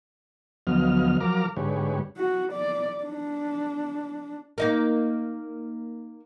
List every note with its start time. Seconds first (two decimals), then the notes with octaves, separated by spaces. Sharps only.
0.67 D2 F3 F#3 B3 D#5 F6
1.20 F3 F#3 A#4 A#5 D6 F6
1.56 G#2 D3 G#3 G4 B4 C#5
2.17 F#4
2.52 D5
3.04 D4
4.58 A#3 D#4 A#4